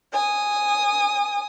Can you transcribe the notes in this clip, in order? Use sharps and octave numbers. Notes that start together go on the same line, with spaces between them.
G#5 D#6